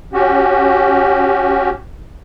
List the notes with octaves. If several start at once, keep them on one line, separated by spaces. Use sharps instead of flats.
C#4 F#4 G4